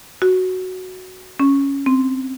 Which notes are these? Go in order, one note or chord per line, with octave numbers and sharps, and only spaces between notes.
F#4
C#4
C4